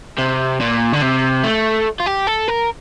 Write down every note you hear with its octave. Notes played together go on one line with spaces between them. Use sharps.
C3
A#2
D3
C3
A3
F4
G4
A4
A#4